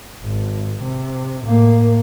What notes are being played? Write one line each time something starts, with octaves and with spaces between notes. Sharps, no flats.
G#1
C3
A2 A#3